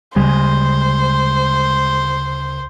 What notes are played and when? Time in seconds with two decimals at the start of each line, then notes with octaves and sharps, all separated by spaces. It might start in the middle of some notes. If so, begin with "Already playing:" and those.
0.16 D2 C#3 G3 G#3 G4 G#4 C5